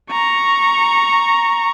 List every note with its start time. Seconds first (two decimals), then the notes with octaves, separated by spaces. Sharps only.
0.11 A#5 C#6